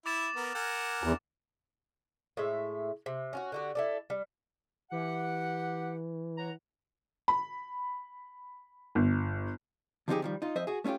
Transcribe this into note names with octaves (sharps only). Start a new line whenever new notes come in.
E4 E5 D6 A6 E7
B3 A#4
A#4 F#5 G#5
E2
A2 G#3 E5
C3
C#4 F4 F#4
D3 F#4 G4
E4 A4 D5
G3
E3 G4 F#5
C#5 F#5 A#5
B5
G1
D3 F3 C4 D#4 G4 G#4
D#3 F3 G3
D#4 F4
F2 C5 D#5 E5
F#4 G#4
A3 C#4 E4 F4 G4